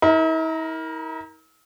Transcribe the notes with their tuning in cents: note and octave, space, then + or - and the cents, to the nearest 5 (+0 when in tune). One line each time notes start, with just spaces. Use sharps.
E4 -45 A#4 +0